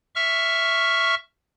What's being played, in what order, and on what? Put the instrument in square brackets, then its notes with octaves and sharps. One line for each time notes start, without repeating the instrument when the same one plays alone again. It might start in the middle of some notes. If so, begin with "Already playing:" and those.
[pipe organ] E5 C#6 F6